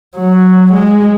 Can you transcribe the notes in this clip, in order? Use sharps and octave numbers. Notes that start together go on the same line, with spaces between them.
F#3
G#3